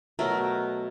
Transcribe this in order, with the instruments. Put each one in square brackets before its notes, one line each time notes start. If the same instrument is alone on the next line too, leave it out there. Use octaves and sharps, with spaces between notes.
[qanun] B2 F#3 A3 A#4